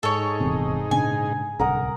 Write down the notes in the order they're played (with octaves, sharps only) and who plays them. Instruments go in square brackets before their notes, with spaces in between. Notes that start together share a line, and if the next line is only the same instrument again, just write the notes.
[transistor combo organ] G#2 D#4 G#4 [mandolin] A4 C#5
[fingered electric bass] D#1 E2 C3
[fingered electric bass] A#2 C#3 D4 [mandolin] G#5
[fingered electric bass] D1 C2 [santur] A#4 F#5 D#6